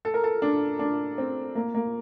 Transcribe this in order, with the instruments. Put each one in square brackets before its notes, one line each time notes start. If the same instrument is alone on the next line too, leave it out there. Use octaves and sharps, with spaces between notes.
[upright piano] A4
A#4
A4
D4
D4
C4
A#3
A#3